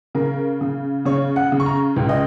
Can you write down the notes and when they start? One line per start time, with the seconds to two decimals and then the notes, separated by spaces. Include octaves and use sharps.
0.15 C#3 A#4
0.61 C#3
1.05 C#3 C#5
1.36 F#5
1.52 C#3
1.60 C#6
1.66 A#5
1.96 C#2
2.09 D#5